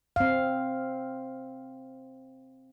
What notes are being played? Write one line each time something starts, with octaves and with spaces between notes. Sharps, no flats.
C4 F5